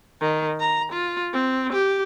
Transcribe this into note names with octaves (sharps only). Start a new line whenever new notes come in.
D#3
A#5
F4
C4
G4